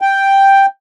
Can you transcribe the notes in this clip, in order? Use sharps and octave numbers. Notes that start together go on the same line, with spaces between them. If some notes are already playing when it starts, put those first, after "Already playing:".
G5